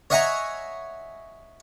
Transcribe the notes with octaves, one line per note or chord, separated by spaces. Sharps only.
C#5 D#5 E5 F#5 G#5 A#5